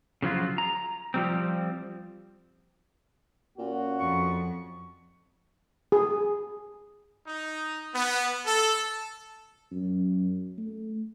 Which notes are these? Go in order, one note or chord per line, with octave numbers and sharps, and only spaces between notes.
C#3 F3 F#3 F4
A#5
F3 G3 C4
A#2 A#3 C#4 F#4
F2 C#6
G#4
D#4
B3
A4
F#2
A3